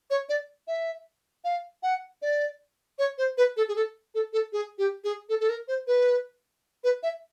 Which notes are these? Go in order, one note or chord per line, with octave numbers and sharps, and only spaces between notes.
C#5
D5
E5
F5
F#5
D5
C#5
C5
B4
A4
G#4
A4
A4
A4
G#4
G4
G#4
A4
A4
A#4
C5
B4
B4
E5